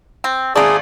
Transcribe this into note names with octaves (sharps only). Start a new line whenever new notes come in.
C4
G#1 A3 A#3 G#4 D5